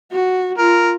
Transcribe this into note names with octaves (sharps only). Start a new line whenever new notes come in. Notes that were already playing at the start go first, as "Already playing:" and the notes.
F#4
F4 A#4